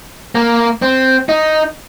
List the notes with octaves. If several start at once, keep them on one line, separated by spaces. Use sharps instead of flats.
A#3
C4
D#4